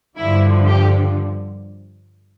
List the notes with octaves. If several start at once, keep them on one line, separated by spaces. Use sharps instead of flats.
G2 D3 F3 E4
G4